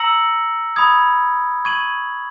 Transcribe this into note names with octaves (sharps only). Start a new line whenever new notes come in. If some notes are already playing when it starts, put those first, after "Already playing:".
Already playing: A#5 E6 A#6 C#7 F#7
B5 D#6 G#6
C#6 G#6 D#7 F#7